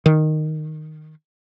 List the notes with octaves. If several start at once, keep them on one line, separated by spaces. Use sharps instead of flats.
D#3